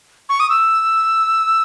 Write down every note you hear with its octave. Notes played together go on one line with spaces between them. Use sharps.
C#6
D#6
E6